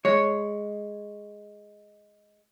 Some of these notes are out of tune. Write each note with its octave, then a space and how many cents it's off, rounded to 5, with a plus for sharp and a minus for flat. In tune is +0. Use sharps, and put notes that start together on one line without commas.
G#3 +0 C#5 +0